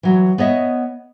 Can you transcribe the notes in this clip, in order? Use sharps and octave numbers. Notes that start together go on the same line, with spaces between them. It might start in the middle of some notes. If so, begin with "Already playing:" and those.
E3 F#3
B3 C#5 D#5 E5